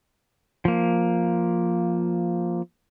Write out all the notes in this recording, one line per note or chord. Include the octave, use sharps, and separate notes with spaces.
F3 A#3